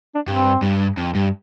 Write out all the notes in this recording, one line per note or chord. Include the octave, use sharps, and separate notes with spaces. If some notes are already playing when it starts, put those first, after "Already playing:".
D4
G2 C4
G2
F2
G2